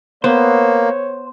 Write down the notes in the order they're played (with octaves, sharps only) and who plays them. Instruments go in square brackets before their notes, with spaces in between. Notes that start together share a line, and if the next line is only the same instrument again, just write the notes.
[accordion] A#3 [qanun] B3 [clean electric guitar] C5 [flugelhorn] C#5